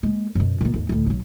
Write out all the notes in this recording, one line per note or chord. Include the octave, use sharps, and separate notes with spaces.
G#3 A#3
F#2 B2
A#2 B3
D#2 G#2
D2 A2
B1 F#3